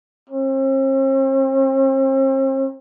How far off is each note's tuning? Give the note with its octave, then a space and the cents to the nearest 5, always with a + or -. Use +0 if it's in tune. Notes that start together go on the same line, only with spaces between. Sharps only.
C4 +45